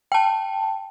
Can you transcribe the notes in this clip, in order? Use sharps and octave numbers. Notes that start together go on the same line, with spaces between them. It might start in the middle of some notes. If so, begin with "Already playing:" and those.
G5 A5